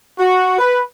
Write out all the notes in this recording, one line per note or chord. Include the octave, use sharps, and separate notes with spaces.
F#4
B4